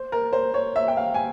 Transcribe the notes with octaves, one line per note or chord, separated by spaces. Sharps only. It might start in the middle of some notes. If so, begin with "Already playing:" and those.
Already playing: C5
A#4
C5
C#5
E5
G5
F5
G#5